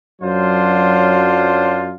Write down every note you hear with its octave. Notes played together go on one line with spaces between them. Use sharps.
F#2 F#3 D4 F4 C5